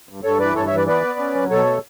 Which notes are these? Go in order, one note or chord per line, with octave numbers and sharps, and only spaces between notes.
G2
G2 A4 C#5
E3 B4 D5
G2 A4 C#5
E3 C#5 E5
B4 D5
B3 B4 D5
B3
C#4
F#3
B2 A4 C#5
A3